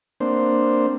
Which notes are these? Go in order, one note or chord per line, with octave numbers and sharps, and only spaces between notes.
A#3 C4 D4 C5